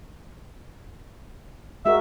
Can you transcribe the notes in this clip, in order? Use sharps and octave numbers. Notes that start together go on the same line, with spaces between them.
G#3 F#4 A#4 E5